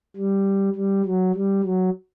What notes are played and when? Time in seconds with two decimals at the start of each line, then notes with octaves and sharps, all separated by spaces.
0.16 G3
0.75 G3
1.05 F#3
1.35 G3
1.63 F#3